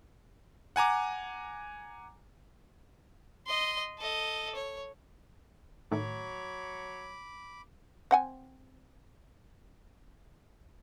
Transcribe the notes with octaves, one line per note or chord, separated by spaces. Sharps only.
F#5 G#5 A#5 D6
D#5 C6
A4 D#5
C#5
A2 D#3 F#3 A3 C#5 B5 D6
C4 F#5 G#5